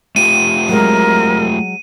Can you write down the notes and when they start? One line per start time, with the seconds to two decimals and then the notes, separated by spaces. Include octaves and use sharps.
0.16 A3 F4 G4 D#7
0.69 F#3 G#3 A#4